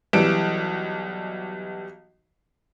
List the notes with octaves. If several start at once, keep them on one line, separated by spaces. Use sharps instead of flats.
B1 E3 G3 D7 E7